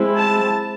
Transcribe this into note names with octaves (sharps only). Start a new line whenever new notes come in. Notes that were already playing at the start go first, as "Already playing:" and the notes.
Already playing: G#3 C4 E4
A5